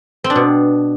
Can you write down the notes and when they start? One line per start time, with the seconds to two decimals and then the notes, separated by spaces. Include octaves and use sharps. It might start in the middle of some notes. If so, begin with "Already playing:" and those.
0.24 C4
0.30 D4
0.35 B2